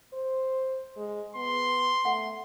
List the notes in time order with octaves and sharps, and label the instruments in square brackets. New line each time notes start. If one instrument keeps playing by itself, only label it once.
[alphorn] C5
G#3
[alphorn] B3 [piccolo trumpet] C6
[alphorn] A3 [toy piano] F#5